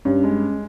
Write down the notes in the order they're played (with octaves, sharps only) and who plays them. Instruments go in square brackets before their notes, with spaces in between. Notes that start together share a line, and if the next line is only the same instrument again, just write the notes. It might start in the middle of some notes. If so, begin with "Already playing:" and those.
[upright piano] G2 [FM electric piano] C#4
[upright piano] G#3